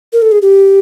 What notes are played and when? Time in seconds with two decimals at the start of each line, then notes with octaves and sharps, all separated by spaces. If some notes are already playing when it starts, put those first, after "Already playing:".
0.13 A#4
0.22 A4
0.32 G#4
0.42 G4